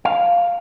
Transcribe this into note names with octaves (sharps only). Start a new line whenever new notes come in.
F5